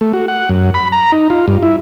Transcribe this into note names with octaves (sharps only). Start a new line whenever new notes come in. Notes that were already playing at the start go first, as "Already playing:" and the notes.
A3
F#4
F#5
F#2
B5
A#5
D#4
F4
G2
E4